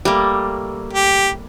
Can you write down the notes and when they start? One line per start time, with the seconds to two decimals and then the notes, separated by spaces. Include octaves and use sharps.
0.05 G3 A3 A#3
0.93 G4